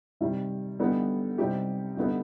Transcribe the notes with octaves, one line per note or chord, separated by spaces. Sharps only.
C3 D#3 G3
D3 G3 B3 D#4
C3 G3 C4 D#4 G4
D3 G3 B3 D#4